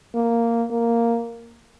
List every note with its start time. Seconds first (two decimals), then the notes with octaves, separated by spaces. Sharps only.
0.15 A#3
0.71 A#3